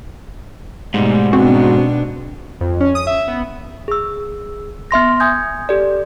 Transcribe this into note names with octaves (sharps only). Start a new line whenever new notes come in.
G#2 B2 G3 A3
B2 B3 C4 D4 F#4
F2
C#4
D#6
E5
B3
G#4 E6
B3 E5 C6 A#6
G#5 D#6 G6 G#6
G4 A4 D5